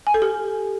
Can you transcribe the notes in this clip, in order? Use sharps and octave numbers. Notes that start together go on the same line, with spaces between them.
G#5
A4
G4